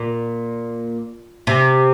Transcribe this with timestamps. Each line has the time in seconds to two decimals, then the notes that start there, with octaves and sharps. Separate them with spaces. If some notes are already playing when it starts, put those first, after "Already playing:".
Already playing: A#2
1.47 C3